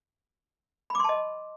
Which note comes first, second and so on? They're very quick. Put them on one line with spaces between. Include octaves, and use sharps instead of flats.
B5 D6 C6 A5 D#5